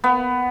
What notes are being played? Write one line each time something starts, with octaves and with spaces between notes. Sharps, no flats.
B3